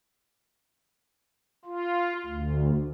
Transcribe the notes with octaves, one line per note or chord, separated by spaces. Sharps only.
F4
D2